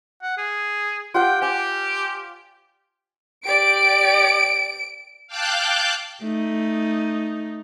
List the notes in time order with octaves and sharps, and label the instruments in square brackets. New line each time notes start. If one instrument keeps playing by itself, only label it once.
[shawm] F#5
G#4
[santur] F4 G4 F#5 [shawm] G5
[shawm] G4 [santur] G5 G#5
[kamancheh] G4 D5 [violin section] D7
[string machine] F5 G5 A5 D6 F#6 G6
[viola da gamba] A3 D#4